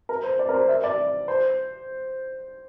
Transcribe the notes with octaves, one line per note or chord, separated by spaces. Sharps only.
A#4
C5
D5
A#4
C5
E5
D5
C5